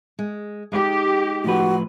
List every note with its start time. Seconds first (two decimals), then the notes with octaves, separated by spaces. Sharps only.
0.19 G#3
0.72 G#3 D#4 G4
1.44 A2 F3 F#4 B4